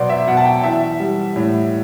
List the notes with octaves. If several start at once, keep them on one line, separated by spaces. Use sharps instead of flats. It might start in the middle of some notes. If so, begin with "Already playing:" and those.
Already playing: B2 F#3 B3 C5 D5
E5
B2 F#5
A5
G5
E3 E5
G3
A2